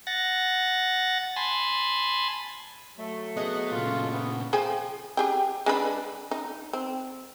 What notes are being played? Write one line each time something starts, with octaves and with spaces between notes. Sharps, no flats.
F#5 A6 A#6
G#5 A5 B5 C6
F#3 A3
B3 G#4 D#5 F#5
A#2 C#3 F4
B3
F3 G#4 G5
G4 G#4 G5
G#3 D4 B4
D#4
C4